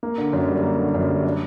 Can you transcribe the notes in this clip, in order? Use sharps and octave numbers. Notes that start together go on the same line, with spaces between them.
A#3
D3
F#2
G3
A#3
D3
F#2
G3
D4